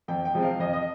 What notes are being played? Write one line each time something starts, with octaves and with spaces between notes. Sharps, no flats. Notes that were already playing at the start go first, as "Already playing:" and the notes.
F2 G5
G5
C3 F3 G#3 C4
F5
F2 D#5
D#5